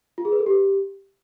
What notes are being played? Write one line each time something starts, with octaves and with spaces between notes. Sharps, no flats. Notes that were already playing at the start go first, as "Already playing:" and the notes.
F4
G#4
B4
A4
G4